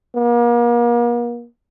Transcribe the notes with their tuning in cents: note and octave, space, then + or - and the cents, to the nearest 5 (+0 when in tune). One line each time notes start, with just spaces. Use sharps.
A#3 +40